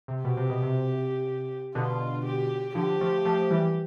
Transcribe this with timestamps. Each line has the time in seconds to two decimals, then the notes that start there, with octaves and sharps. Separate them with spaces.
0.08 C3
0.24 B2 G4
0.37 C3
0.50 B2
0.62 C3
1.75 B2 D3 F4
2.26 G4
2.75 D3 F3 G4
3.01 F3 A3
3.25 F3 A3
3.51 E3 G3